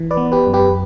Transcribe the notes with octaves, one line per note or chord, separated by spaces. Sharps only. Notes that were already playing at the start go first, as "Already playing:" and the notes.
Already playing: E3
B4 D5
B3
G4 B4
F#2
G4 B4